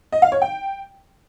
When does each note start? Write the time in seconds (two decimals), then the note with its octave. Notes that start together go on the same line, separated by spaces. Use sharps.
0.12 D#5
0.22 F5
0.32 C#5
0.42 G5